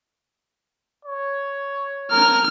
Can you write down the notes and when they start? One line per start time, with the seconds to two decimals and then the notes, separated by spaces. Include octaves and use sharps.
1.05 C#5
2.11 A#4 F6